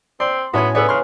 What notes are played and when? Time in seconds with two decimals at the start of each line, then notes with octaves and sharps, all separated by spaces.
0.20 C4 D5 C6
0.53 A2 B3 C#4 F#4 C#5 G#5
0.75 B3 G#4 A4 B4 C#5 D5
0.89 C#3 C6 F6